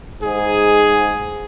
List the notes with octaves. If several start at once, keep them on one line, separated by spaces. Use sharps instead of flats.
G#2 G#4